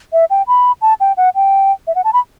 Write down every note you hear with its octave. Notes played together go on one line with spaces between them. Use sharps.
E5
G5
B5
A5
G5
F#5
G5
E5
F#5
A5
B5